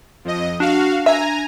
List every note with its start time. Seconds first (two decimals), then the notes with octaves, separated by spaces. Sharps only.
0.25 F2 D#5
0.60 D4 F#4 F5
1.06 E5 G#5 A#5